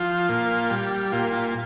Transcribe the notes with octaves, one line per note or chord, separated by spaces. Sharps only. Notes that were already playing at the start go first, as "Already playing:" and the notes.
Already playing: F3 F4
A#2
G3
A#2 F4
F4